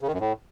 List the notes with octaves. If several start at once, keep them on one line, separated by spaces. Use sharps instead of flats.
C#3
D#3
F#2
A2